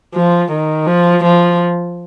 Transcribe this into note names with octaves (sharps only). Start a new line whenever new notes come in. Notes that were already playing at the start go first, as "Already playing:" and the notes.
F3
D#3
F3
F3